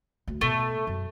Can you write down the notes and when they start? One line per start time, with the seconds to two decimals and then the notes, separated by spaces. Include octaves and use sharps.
0.28 D2
0.41 B2 A3
0.87 F#2